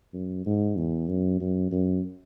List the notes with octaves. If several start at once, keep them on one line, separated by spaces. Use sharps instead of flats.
F#2
G#2
E2
F#2
F#2
F#2